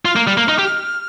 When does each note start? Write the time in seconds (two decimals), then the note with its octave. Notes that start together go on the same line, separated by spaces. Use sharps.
0.05 F4 F6
0.16 A#3
0.27 G3
0.37 A#3
0.48 D#4
0.59 G4